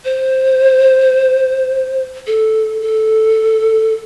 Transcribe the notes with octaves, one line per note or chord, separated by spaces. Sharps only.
C5
A4
A4